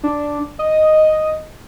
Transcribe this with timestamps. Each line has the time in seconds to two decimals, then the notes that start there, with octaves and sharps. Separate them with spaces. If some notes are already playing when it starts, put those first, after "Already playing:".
0.03 D4
0.59 D#5